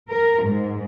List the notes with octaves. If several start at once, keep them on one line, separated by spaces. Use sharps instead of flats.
A#4
G#2